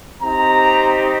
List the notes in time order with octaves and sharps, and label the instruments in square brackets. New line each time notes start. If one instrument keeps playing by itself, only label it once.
[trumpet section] C4 D#4 G4 A#5